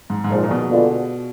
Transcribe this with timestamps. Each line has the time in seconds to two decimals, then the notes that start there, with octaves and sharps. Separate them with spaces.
0.10 G#2
0.24 G#2
0.30 A#2 F3 G#3 D#4
0.43 A#2
0.51 B2
0.70 D3 G#3 B3 D4 F4